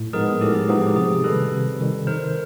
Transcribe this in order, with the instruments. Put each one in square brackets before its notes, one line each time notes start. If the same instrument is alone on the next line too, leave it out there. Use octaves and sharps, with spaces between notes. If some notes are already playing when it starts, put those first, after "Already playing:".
Already playing: [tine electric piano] A2
[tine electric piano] F3 G#3 B3 D#4 [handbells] G#4 A#4
[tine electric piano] A2 [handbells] G4 A4
[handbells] G#4
[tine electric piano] F3 G#3 B3 D#4 [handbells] G4
[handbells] G4
[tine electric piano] C3 [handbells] G#4
[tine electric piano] D#3 G3 [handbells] A4 B4
[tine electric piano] C3
D#3 G3
[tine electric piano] D#3 [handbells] A#4 C5